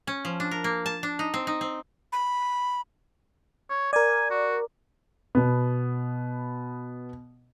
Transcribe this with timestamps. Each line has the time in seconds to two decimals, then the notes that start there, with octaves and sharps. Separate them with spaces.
0.07 C#4
0.25 F3
0.40 D4
0.51 A#4
0.64 A#3
0.86 A5
1.03 D4
1.19 D#4
1.34 C4
1.47 D#4
1.61 C4
2.13 B5
3.70 C#5
3.93 A#4 D5 G#5
4.31 F#4
5.35 B2 B3